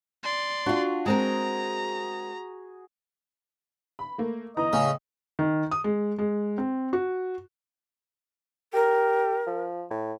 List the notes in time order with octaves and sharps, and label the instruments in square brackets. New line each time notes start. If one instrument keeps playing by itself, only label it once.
[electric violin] D5 C6
[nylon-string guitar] D4 F4 [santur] F#4
[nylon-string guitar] G#3 C4 A#4 [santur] G#4 [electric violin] A#5
[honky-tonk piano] B5
A3 A#3
[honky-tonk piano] G1 E3 A#5 [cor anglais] D#5
[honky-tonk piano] A2 [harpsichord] C#3
[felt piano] D#3
D#6
G#3
G#3
C4
F#4
[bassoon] G4 [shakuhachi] A#4
[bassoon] F3
A2